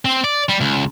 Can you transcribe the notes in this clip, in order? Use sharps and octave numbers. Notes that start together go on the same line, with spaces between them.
C4
D5
G3
C#2